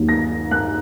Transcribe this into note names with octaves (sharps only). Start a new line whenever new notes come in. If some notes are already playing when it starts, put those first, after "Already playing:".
Already playing: D#2 D#3 F#3 A#3
A#6
F#6